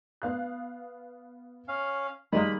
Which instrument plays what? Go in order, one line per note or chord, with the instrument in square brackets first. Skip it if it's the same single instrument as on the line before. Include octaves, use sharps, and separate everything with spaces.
[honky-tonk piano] B3 F5 F#6
[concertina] C#4 F5
[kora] D#3 G#3 A#3 [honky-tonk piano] G3 [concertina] B5